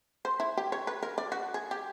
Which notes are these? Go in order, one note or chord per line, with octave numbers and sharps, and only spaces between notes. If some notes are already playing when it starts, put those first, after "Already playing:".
C5
E4
G4
C#5
B4
A#4
D5
F#4
G#4
G4